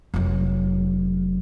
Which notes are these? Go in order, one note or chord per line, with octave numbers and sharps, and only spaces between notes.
F1 F#3